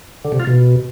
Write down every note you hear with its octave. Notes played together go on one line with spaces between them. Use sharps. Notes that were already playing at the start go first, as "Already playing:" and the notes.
D3
C3
F4
B2